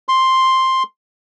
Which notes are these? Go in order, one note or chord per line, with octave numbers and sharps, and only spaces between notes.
C6